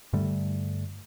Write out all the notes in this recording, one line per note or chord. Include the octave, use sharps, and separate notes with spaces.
G2 D3 G3 A3